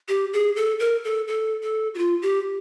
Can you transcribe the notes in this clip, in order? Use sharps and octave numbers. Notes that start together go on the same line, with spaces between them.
G4
G#4
A4
A#4
A4
A4
A4
F#4
F4
G4